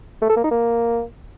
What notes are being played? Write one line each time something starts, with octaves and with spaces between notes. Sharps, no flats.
A3
A4
A#3
D#4
A#3